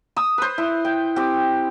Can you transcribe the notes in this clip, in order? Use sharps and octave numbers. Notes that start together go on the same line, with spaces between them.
D#6 E6
B4 C5
E4
G5
C4 G4